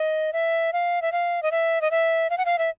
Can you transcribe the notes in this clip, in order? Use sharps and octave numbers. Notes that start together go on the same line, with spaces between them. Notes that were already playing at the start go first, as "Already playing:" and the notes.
Already playing: D#5
E5
F5
E5
F5
D#5
E5
D#5
E5
F5
F#5
F5
E5